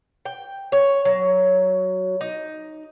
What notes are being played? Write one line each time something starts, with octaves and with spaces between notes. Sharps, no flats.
G5
C#5
F#3
D#4